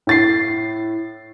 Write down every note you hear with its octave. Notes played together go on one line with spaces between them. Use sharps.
A2 A6 C7